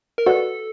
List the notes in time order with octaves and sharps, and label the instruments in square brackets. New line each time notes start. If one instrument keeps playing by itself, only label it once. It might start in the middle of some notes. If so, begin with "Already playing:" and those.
[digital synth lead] A#4
[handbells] F#4 B4 D5 F#5 [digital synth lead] A4